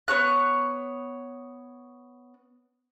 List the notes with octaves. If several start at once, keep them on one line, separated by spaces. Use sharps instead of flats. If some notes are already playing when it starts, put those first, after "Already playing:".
B3 C#5 F#6